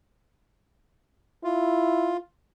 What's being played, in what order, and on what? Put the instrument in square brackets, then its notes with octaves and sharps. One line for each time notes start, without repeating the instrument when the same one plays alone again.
[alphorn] E4 [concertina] F4